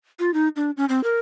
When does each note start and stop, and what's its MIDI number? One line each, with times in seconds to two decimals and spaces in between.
0.19 0.33 65
0.34 0.48 63
0.56 0.71 62
0.77 0.85 61
0.89 1.03 60
1.04 1.20 70